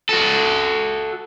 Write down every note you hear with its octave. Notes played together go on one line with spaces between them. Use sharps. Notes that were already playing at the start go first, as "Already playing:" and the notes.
F#4 A4